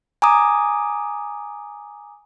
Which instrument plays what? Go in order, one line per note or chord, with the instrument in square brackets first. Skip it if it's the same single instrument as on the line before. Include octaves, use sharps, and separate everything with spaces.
[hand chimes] G#5 A#5 D6 D#6